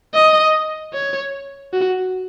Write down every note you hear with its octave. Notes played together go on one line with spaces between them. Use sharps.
D#5
C#5
F#4